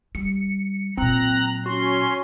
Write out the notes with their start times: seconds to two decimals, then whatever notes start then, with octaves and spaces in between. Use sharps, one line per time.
0.15 G3 C#7
0.97 A#2 F#3 C4 A#5 F#6
1.66 C#4 F#4 C6